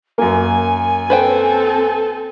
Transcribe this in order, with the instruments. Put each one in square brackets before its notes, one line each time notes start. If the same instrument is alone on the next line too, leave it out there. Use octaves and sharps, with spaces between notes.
[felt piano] F#2 A#3 [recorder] G#5
[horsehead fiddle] C4 A4 [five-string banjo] B4 C5 G5